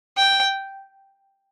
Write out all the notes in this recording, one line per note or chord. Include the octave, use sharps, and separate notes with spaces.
G5